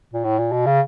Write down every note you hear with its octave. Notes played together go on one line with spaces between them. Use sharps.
A#2
A2
A#2
B2
C#3